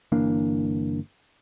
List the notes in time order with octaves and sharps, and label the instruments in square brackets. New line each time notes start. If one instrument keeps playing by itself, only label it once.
[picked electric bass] G1 E3 A#3 D4